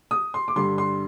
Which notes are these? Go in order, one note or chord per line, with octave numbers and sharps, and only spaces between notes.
D#6
C6
D6
G2 D3 G3 C6
C6